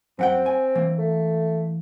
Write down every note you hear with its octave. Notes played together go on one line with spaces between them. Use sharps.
F#2 C4 F#5 G5
G#5
E3 A#3
A3